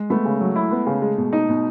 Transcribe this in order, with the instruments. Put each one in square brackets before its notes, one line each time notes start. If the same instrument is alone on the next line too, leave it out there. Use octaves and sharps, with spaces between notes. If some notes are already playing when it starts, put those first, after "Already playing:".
Already playing: [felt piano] G#3
[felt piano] A3 [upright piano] B3
[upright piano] C#3
F#3
E4
B3
C#3
G#3
B2
D#4
B2